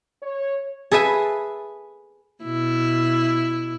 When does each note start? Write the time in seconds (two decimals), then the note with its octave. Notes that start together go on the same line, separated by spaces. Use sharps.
0.21 C#5
0.91 G#4 A4 B4 E5 G#5
2.43 B2 E4